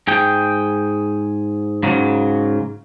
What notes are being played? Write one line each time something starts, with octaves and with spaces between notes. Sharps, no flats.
G#2 G#4 G5
G#2 C#3 F#3